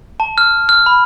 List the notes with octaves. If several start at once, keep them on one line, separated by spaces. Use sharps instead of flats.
A5
F6
F6
B5